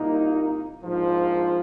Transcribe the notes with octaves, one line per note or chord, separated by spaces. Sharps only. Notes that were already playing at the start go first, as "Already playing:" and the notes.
Already playing: C2 A#2 A#3 D#4
A#1 G#2 F3